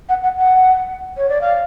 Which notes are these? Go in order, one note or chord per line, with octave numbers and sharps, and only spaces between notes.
F#5
F#5
F#5
C#5
D5
F5